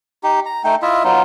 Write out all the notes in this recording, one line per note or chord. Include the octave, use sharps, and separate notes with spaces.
D#4 G4
A#5
A3 D#4 G5
E4 F4 D#5 E5
F#3 B3 D#4 F4